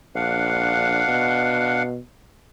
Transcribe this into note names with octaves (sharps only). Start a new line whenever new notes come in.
A#1 D4 F5 F#5
B2